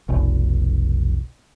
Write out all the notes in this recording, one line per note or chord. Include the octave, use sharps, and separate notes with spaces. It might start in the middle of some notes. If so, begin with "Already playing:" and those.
F1 B1